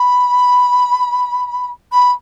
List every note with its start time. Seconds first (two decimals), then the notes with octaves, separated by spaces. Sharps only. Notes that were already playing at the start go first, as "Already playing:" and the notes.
Already playing: B5
1.92 B5